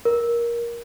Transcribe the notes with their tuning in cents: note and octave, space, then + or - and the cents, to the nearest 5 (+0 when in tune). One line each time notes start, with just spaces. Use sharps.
A#4 +15